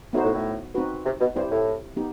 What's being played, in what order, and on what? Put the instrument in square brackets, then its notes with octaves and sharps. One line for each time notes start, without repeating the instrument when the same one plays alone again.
[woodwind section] A2 [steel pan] B3 D#4 F#4 C5
[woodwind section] A2
A2
[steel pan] C4 D#4 F#4 B4
[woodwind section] C3
B2
[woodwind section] G2 [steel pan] C4 E4 G4 C5
[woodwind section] A2
[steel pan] B3 D#4 G4